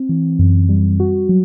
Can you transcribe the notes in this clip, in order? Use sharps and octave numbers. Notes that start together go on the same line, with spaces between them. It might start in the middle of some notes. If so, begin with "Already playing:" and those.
Already playing: C4
E3
F#2
G3
F#4
F#3